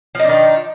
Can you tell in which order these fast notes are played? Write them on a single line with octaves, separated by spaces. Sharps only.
F3 D#4 D4 D#3